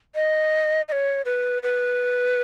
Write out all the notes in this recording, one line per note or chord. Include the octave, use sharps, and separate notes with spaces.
D#5
D#5
C#5
B4
B4